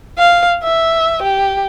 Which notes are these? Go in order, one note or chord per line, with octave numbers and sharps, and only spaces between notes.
F5
E5
G4